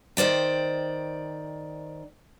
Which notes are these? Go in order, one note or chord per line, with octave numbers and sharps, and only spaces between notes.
D#3 C5 D5 G5